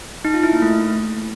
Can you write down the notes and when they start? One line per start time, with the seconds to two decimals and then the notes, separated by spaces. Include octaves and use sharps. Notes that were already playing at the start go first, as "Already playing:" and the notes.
0.25 D#4
0.34 F4
0.43 E4
0.53 A#3
0.62 A3